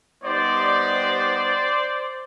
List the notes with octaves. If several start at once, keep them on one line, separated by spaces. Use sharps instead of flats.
G3 B3 D#4 G4 C5 D5